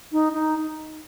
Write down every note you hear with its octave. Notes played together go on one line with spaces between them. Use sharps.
D#4
D#4